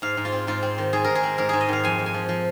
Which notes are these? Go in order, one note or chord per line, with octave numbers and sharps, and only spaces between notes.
G#2 F5
G#2
F4
C4
G#2 F4
C4
D#3
G#2 G#4
G#2 A#4
G#4
C4
G#2 A#4
G#2 G#4
D#5
D#3 F5
F2 G#5
F2
G#5
F3
F3